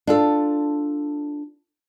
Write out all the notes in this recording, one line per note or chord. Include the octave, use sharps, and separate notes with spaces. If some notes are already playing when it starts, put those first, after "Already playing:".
D4 F4 A4